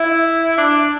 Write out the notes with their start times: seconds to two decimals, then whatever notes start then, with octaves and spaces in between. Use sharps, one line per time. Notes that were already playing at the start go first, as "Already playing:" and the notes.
Already playing: E4
0.58 D4